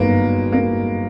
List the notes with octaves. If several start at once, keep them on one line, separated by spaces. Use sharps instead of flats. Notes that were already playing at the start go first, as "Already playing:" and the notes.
Already playing: G1 F#2 D#3 G#3 A#3 B3
A#3